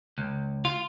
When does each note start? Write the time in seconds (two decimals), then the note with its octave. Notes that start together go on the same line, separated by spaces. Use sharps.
0.18 C#2
0.65 F4